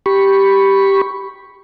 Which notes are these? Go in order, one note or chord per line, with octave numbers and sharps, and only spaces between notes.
G4 B5 C#6